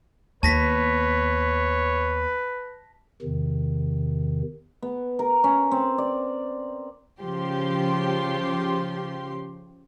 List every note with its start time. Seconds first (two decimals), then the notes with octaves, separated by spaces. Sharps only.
0.43 D#2 B3 B4 C#5 A5 A#6 B6
3.22 E2 C3 D#3
4.82 B3
5.19 A#4
5.44 C#4
5.71 C4
5.98 D5
7.22 C#3 F3 G4 C6